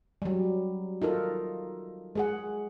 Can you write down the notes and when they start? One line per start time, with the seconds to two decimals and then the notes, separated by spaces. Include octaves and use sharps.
0.22 F#3 G3
1.02 D#4 F4 A4 A#4
2.15 G#3 G#4 F#5